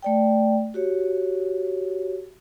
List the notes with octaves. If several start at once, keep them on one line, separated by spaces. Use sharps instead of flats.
A3 D5 G5
F#4 G4 C#5